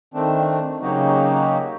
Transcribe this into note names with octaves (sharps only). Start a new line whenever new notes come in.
D#3 A3 C4 D4
C#3 F#3 A#3 D#4 F#4 G4